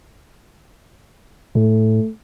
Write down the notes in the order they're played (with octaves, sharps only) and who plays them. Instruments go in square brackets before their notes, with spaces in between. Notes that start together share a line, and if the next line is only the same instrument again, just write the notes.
[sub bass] A2 [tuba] A3